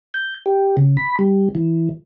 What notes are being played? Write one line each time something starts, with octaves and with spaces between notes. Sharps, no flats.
G6
G4
C#3
B5
G3
E3